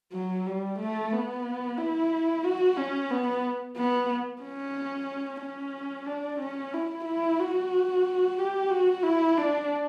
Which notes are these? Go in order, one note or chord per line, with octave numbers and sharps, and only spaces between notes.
F#3
G3
A3
B3
E4
F#4
C#4
B3
B3
C#4
C#4
D4
C#4
E4
E4
F#4
G4
F#4
E4
D4